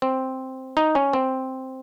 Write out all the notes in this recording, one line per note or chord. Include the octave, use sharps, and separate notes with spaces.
C4
D#4
C#4
C4